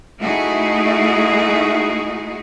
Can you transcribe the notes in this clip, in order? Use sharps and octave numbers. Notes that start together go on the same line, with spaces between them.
A3 D#4 E4 F#4 G#4